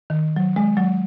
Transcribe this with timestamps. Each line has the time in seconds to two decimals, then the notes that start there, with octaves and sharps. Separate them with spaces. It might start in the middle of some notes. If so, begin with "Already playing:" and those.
0.10 D#3
0.36 F#3
0.56 G#3
0.77 F#3